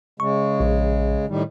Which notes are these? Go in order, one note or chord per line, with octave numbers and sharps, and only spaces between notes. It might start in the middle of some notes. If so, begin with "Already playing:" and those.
C#3 G#3 C#6
A#1
A2 D#3 G3